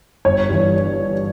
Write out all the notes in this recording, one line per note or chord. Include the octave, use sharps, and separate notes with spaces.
G1 C#5
G2 E3